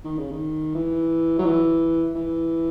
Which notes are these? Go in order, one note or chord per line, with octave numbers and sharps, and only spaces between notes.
D#3
C#3
D#3
E3
F#3
E3
E3